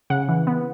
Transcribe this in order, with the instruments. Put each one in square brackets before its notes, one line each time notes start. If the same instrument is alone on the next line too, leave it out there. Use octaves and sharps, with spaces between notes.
[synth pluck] C#3 F#5
E3
B3